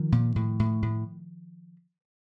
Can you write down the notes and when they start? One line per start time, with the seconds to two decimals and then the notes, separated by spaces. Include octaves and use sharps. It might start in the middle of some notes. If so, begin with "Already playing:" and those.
Already playing: D#3 F3
0.12 A#2
0.36 A2
0.60 A2
0.82 A2